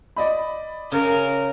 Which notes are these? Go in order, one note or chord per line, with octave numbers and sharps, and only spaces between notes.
D5 D#5 B5
C#3 A#4